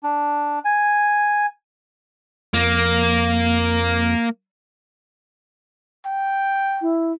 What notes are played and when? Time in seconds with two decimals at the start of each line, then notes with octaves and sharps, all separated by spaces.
0.03 D4
0.65 G#5
2.54 F2 A#3
6.06 G5
6.82 E4